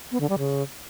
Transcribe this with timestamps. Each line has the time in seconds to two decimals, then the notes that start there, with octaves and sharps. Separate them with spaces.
0.12 B3
0.21 D3
0.30 G3
0.39 C#3